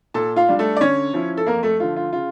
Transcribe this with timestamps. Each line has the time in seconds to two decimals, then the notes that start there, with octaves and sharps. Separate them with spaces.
0.14 A#2 A4 A5
0.36 F4 F5
0.48 G3 D4
0.59 A3 A4
0.76 D5
0.81 D3 C#4 C#5
1.13 F3 C#4 E4
1.37 A4
1.46 F2 A#3 A#4
1.63 A3 A4
1.80 D3 F3 A3 F4
1.96 F4
2.13 C#3 F4